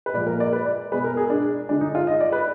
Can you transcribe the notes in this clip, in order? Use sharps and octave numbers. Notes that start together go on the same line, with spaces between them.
B4
A#2 F3 G#3 D5
A#4
D5
B4
D5
B2 G#3 B4
A#4
G#4
D4
D3 G#3 D4
D#4
F4
D#5
D5
B4